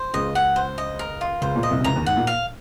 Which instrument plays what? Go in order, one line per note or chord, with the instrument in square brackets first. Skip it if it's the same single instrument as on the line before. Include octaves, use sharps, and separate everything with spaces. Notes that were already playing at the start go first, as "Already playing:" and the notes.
Already playing: [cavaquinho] C5
[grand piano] C#2 C#3 [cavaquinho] D#5
[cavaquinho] F#5
C5
D#5
A#4
F4
[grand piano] C#2 C#3 [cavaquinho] C5
[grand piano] A#2
[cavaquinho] D#5
[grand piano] C2 C3
C3
[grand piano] C#2 C#3 [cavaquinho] A#5
[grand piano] D#2 D#3
[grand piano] G#2 [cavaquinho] F#5
[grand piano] A#2
[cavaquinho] F5